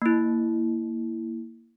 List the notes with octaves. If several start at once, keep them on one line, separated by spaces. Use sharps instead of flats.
A#3 E4